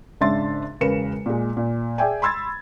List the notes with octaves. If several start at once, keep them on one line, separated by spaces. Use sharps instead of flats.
G#1 C#3 D4 E5 C6 A6
E1 C#3 A#4 B4 C#7 E7
A#2 G#3
A#2
G#4 D5 E5 G5 G#5
B5 C6 E6 G#6 A6